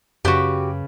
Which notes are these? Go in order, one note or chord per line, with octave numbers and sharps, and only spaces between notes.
F#2 C#3 F#4 G4 B4